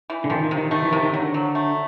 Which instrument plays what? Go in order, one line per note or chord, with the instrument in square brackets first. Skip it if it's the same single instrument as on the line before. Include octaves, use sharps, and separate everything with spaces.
[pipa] E3
[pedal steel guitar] D3
[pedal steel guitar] D#3 [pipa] F3
[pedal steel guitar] D#3
[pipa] C3
[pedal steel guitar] D#3
[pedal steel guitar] D#3 [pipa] A3
[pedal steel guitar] E3
[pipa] C3 [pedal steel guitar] D#3
[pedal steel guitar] D#3
[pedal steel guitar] D3 [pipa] F#3
[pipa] F#3
A3